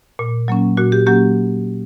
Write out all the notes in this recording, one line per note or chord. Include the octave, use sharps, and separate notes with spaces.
A#2
F#3 A#3 C#4
A#2 F#4
G4
F#3 A#3 C#4 G4